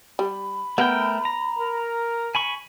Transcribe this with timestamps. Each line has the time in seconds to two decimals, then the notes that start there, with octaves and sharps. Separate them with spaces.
0.19 G3 B5
0.78 A3 B3 A#4 G5
1.25 A#5
1.59 A#4
2.35 G#5 B5 C#6